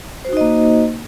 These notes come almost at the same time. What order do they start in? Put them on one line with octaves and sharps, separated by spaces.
C5 F#4 D#4 D#5 A#3